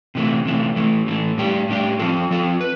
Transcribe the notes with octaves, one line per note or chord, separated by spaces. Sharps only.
C3 E3 A3
C3 E3 A3
A2 E3 A3
A2 E3 A3
A2 G3 D4 G4
A2 G3 D4 G4
F3 C4 F4 A4
F3 C4 F4 A4
B4